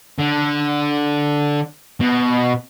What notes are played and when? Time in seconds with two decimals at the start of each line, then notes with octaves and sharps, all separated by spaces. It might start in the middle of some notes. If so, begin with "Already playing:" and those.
0.19 D3
2.01 B2